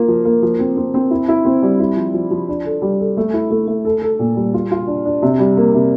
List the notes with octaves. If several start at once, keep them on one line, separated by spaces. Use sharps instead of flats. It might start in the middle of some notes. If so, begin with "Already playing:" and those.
Already playing: A#3 F4
F3
A#3
F3
C4
C4
C4
E4
E4
C4
G3
E4
F3
F3
F3
D4
A4
G3
A4
A3
E4
A3
A3
A4
A4
A#2
G3
F4
F4
D4
D4
C3
G3
A#3
C3